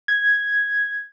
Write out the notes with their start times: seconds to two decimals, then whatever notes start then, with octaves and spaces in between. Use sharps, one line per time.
0.08 G#6